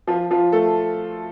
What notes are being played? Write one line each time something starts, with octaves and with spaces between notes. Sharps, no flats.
F3 F4
F3 F4
A3 A4